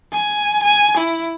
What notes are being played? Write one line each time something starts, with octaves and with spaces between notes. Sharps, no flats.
G#5
G#5
E4